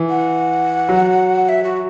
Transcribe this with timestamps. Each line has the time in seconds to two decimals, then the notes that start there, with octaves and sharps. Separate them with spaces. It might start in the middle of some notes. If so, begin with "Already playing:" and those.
Already playing: E3
0.10 F#5
0.89 F#3
1.49 E5
1.63 F#4